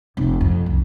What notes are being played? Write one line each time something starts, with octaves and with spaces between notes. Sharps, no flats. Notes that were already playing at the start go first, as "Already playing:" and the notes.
F1 F2
F2
C2